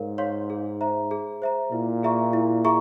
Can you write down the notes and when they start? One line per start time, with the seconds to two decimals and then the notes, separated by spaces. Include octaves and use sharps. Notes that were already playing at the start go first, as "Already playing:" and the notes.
Already playing: G#2 A#4 C#5 F5
0.18 C#5 F5 C6
0.50 G#4
0.81 C5 E5 A#5
1.11 G#4
1.42 C5 E5 A#5
1.72 A#2 E4
2.03 G#4 E5 A#5 C#6
2.33 E4
2.65 G#4 E5 A#5 C#6